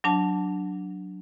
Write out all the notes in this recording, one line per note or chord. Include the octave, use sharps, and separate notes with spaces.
F#3 D4 A5